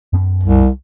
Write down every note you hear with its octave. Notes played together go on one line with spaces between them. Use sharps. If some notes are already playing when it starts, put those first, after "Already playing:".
F#2 B3
C2